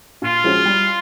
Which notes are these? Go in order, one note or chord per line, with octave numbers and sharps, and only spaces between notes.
A#2 F4
F3 G#3 C#4 F#4
G3